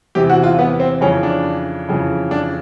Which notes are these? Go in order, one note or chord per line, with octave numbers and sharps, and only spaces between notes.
E2 C3 E3 G4
F#4
F4
B3
C4
F2 C#3 E3 C#4
D4
F2 C#3 E3
D4